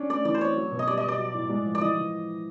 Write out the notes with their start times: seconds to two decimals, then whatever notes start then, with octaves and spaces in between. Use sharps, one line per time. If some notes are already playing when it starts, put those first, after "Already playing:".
Already playing: C#4 D4
0.10 A3 D5
0.25 E3 D5
0.34 C5
0.41 C4 C#5
0.56 F#3
0.72 B2
0.79 D#5
0.87 G3 D5
0.97 D#5
1.03 B2 D5
1.18 F#3
1.34 A2
1.49 G#3
1.65 F3
1.75 D5
1.81 E3 D#5
1.97 E3